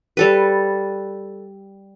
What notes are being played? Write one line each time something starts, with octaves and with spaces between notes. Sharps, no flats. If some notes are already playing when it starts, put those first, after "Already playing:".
G3 A4 B4